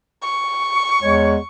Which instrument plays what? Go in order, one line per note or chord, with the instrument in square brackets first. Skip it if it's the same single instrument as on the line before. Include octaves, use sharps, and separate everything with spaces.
[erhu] C#6
[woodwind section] E2 G#3 C#5